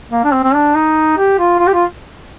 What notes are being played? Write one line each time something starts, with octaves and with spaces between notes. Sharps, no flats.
A#3
D4
C4
C4
D4
D#4
G4
F4
F4
G4
F4